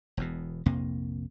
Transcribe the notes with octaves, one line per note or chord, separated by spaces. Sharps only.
E1 E2 B2
A#1 F2 C3 A#3